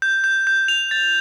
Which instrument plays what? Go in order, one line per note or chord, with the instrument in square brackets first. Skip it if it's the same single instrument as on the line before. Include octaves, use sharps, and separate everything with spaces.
[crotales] G6
G6
G6
F7
A6